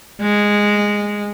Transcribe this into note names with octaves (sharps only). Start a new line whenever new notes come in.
G#3